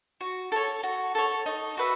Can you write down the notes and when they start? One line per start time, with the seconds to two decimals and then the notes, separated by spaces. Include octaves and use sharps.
0.21 F#4
0.52 A4 C#5
0.83 F#4
1.15 A4 C#5
1.46 D#4
1.77 F#4 B4 E5